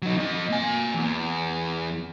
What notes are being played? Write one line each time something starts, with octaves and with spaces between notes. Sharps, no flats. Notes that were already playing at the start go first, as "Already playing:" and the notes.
F#3 D#4
F2 D#5
A#3 G#5
E2